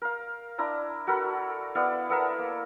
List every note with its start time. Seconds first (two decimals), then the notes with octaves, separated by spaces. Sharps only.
0.02 A#4 F5
0.58 D4 E4 A#5
1.07 F#4 A4 A#4 B5
1.75 B3 E4 D5 F5
2.09 B3 A4 A#4 E5
2.39 A#3